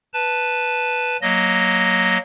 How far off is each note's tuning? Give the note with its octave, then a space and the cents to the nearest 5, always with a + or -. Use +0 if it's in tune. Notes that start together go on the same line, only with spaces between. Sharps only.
B4 +0 A5 +0
F#3 +0 A#3 +0 D#5 +0